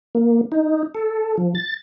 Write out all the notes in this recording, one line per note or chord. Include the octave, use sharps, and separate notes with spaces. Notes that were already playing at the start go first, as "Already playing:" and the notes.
A#3
D#4
A4
F3
A6